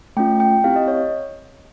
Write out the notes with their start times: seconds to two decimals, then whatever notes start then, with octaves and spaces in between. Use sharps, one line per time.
0.17 A3 C#4 F4 G5
0.40 G5
0.64 C4 E4 G4 F5
0.76 D#5
0.88 C#5